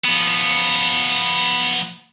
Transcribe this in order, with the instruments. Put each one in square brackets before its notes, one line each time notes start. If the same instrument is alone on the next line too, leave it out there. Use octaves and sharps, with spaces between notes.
[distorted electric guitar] F3 B3